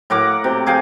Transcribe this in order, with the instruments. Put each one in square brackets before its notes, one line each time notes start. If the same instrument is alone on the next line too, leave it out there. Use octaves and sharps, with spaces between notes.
[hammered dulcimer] A2 A#4 F#5 D6
C3
G#4 F5 G5